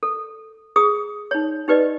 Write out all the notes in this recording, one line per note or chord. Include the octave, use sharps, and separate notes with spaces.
A4
G#4 D#6
D#4 C#5
D#4 G4 B4 D5 D#5